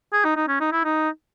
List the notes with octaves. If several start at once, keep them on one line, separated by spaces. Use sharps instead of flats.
G#4
D#4
D#4
C#4
D#4
E4
D#4